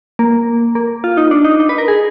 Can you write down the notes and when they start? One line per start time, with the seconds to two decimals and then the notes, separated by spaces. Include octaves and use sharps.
0.19 A#3
0.75 A#3
1.04 F4
1.17 D#4
1.31 D4
1.44 D#4
1.60 D#4
1.69 B4
1.78 A#4
1.88 G#4